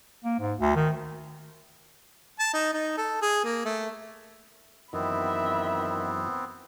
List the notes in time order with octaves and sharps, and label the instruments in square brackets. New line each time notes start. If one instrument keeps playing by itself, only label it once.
[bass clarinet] A#3
G#2
D2
D#3
[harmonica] A5
D#4
D#4
A4
G#4
A#3
A3
[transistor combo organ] F#2 E3 [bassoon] D#3 [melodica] B3 C4 [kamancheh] E5 B5